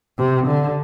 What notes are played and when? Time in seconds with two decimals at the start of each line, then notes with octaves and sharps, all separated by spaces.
0.18 C3
0.47 D3